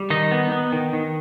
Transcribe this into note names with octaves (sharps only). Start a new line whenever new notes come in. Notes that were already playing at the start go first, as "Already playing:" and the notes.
Already playing: G3
D#3 D#4 D#5
B3
B3
D#3
D#3